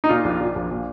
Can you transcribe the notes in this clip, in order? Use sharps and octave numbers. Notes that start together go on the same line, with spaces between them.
D#4
A#2 F4
A#1
A#2
A#1
A#2